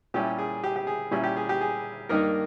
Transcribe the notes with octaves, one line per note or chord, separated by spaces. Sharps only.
A#2 G3 C#4 E4 G4
G#4
G4
G4
G#4
A#2 G3 C#4 E4
G4
G#4
G4
G#4
G2 D#3 A#3 D#4 A#4